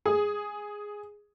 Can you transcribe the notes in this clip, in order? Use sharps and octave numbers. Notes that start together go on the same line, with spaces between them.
G#4